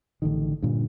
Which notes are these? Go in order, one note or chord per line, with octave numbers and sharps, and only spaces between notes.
A1 D3 D#3
G2 A#2 D3